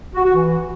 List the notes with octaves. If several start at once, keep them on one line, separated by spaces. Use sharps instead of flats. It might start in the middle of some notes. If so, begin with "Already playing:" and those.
F#4
F#4
E3